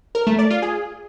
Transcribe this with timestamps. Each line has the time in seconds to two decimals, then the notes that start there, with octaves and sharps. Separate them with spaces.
0.15 A#4
0.27 A3
0.39 D5
0.50 F4
0.62 G#4